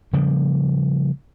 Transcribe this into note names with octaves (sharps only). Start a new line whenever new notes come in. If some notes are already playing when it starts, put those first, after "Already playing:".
C#3 F3 G3 A#3